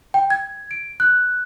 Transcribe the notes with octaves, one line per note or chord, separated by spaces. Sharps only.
G5
G#6
D7
F#6